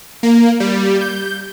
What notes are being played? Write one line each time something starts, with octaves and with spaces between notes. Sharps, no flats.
A#3
G3
G6